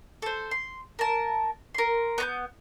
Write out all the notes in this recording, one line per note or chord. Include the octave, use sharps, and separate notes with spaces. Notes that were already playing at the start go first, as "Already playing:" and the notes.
A4 C5
C6
A#4 A5
A#4 C6
B3 A#5 G6